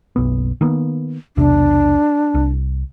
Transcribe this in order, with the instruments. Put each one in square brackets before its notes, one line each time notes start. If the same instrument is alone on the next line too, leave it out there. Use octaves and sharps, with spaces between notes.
[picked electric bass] F#1 B1 B3
D#3 A#3 B3
[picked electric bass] B1 E2 C3 [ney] D4
[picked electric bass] C2